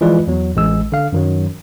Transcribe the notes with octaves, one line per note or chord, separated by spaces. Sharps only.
E3 F3 G#3 F4 B4 D5
E2 F#3
A1 G#3 E6
D3 F5
F#2 D#3 F#3